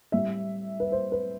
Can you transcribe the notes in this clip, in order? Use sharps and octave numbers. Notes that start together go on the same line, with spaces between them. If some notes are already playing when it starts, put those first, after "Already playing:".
A2 G3 C4 E5
B4
C5
B4